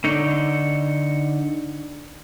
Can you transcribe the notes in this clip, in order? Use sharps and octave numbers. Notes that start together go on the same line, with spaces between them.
D3 D#4 C#5